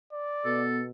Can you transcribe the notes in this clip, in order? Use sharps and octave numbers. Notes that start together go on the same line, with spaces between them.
D5
B2 B3 A4